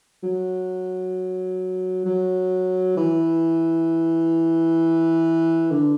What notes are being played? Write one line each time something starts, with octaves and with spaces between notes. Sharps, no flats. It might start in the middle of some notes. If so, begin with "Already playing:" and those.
F#3
F#3
E3
D3